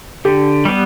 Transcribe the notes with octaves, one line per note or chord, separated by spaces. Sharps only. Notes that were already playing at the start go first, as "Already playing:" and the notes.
D3 G4
G3 B3